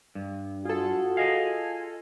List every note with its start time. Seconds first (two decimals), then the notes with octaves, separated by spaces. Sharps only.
0.15 G2
0.65 F4 F#4 G#4 A4
1.17 G#4 D#5 F5 G#5